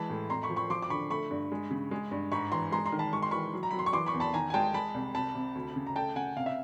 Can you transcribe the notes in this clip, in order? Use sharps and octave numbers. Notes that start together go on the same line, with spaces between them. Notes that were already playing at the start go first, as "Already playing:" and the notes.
Already playing: E3 G#3 A5 B5
A2
F2 A#5 C6
B5 C#6
F3
B5 C#6
F3 C6 D6
D6
D3 B5 C#6
A3 B5 C#6
G2
G#3
C#3
G#3
G2
G#2 B5 C#6
E3 A#5 C6
G#3 A#5 C6
A#5 C6
D#3
A5 B5
G#3 C#6
C6
E3 B5 C#6
F#3
A#5
F#3 B5
C6
C#6
E3 C6 D6
B5 C#6
E2
A5 B5
D#3 G#5 A#5
G#5
G#3 G5 A5
G#3 A5 B5
C2
C3 A5 B5
C3
D2
C#3
A#5
A3 G5 A5
C#3 F#5 G#5
C3 F5
E5